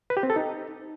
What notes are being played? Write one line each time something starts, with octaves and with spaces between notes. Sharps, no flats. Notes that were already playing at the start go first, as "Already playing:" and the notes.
B4
G4
C4
A4
D#4